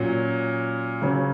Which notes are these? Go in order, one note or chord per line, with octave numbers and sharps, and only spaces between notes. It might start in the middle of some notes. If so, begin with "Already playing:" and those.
Already playing: A#2 F#3 C#4
C#3 F#3 C#4